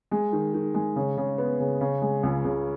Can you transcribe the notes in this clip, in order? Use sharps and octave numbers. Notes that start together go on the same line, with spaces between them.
G#3
D#3
D#3
G#3
C#3
C#3
B3
C#3
C#3
G#3
C#2
C#2